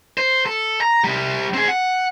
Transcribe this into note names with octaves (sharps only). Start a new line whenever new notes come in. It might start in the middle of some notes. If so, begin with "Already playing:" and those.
C5
A4
A#5
C3 G3
C4 G#4
F#5